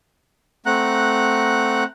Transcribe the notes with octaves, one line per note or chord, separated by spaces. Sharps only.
A3 C4 F#5 A#5 F#6